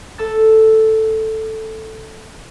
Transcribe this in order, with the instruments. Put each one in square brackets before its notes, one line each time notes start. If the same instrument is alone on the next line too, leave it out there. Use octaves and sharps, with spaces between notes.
[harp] A4 E6 A6